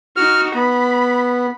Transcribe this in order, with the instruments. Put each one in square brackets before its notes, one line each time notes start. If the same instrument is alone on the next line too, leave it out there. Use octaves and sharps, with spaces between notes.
[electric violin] D#4 F#4 [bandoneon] F6
[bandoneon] B3 [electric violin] B5